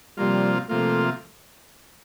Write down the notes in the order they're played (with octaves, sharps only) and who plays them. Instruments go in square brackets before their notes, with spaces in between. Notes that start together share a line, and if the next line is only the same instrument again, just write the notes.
[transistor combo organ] C3 F3 A#3 F4 [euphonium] G3
[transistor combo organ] C3 F3 A#3 F4 [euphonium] A3